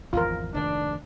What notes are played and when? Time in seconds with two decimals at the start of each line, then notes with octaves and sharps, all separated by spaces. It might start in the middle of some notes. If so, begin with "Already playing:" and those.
0.13 G#1 E2 F3 F4 A#4
0.54 F1 G#2 D#3 D4